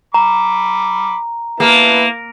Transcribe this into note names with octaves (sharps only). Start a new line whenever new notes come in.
A#5 B5 D6
A#3 B3 E4 A5